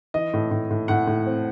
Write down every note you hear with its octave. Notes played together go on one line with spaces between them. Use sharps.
E3 D#5
A2
A2
A2
A2 F#5
A2
C4